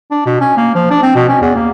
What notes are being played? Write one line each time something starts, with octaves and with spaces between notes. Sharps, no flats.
D4
B2
C#4
A#3
F3
D4
C4
B2
C#4
E2
A#3